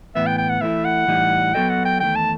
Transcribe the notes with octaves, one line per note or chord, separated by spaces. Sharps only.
A2 E3 B3 E5
G5
G5
F#5
E3 A3 E4 E5
F#5
A2 E3 G3 D#4
F#3 B3 F#4 A4 D#5 G5
F#5
G5
E2 D#3 A3 G5
A5